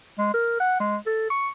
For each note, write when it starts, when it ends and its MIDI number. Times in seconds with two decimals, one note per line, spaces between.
0.18 0.33 56
0.34 0.55 70
0.60 0.79 78
0.80 0.96 56
1.06 1.25 69
1.30 1.49 85